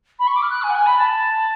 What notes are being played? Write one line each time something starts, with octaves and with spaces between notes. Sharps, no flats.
B5
C#6
D6
F6
F#6
G#5
F#5
G#5
B5
A5